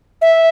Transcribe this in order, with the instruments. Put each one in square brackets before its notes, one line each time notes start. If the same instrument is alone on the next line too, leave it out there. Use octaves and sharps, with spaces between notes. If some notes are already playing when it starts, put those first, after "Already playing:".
[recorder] E5